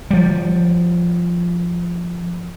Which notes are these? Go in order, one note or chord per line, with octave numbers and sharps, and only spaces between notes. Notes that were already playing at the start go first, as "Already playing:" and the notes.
F3 G3